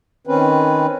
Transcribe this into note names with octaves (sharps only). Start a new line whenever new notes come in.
D#3 C4 C#4 B4